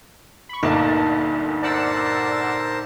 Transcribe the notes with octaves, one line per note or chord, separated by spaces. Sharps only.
B5 C#6
G1 D2 A#2 A#3 D#4 A5
A#4 C5 D5 F#5 A5 E6